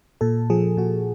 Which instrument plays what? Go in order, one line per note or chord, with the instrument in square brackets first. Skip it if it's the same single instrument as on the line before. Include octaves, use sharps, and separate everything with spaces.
[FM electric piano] A#2 A4
F3 G#4
A#2 F#4